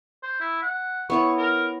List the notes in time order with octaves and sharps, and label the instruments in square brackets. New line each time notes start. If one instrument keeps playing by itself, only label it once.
[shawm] C5
E4
F#5
[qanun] B3 E4 C#5 [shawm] C#6
[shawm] A#4